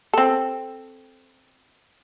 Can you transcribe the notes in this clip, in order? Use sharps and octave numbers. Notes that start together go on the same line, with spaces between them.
C4 A4